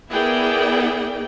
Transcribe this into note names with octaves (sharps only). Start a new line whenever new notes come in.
B3 E4 G#4 A#4 D5 G5